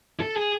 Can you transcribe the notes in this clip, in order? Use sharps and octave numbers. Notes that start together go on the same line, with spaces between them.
A4
G#4